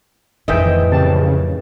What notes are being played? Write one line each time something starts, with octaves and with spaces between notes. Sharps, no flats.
F2 A2 D#3 E3 D#5 E5 G5
C#3 C4 G4 A5